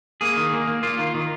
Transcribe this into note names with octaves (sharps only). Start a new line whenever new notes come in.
A#3 G#4
D#3
A#3
A#3
A#3 F4
D#3
D#3